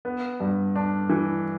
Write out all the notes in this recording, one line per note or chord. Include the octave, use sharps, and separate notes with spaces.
B3
G2
D4
E3